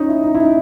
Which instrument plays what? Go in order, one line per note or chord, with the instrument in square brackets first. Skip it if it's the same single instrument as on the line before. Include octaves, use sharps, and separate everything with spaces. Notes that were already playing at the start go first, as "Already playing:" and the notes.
Already playing: [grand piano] C#4 D#4
E4
D#4
E4
D#4